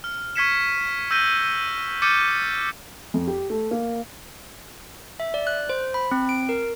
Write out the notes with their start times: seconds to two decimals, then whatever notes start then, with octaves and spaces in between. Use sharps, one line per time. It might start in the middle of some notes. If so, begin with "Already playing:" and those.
0.04 F6
0.36 C#6 F6 G#6 B6 C#7 E7
1.11 E6 G6 A#6 D#7 G7
2.02 D6 F6 G6 A6 C#7 D#7
3.14 F2
3.27 G4
3.50 A3
3.71 A#3
5.20 E5
5.34 D5
5.47 F#6
5.69 C5
5.94 B5
6.11 C4
6.29 D7
6.49 A#4